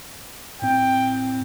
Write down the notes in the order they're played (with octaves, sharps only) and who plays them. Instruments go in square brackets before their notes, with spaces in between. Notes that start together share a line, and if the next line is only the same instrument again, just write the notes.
[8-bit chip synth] A2 C4 [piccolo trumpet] G5